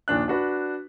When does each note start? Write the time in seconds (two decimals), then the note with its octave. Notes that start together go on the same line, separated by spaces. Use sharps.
0.08 A#1 D#2 D4 F#6
0.28 D4 F#4 B4